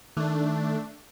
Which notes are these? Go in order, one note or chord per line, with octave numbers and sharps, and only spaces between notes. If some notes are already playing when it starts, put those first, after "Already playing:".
D#3 A3 D4